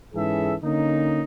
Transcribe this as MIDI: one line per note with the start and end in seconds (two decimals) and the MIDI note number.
0.14 0.54 44
0.14 0.54 52
0.14 0.54 61
0.14 0.54 68
0.14 0.54 69
0.14 0.54 76
0.63 1.23 50
0.63 1.23 58
0.63 1.23 61
0.63 1.23 63